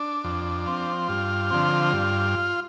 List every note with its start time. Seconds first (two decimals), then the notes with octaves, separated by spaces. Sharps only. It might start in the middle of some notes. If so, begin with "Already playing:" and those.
Already playing: D4
0.24 F2
0.66 F3 C4
1.09 G2 F4
1.50 D3 F3 C4
1.93 G2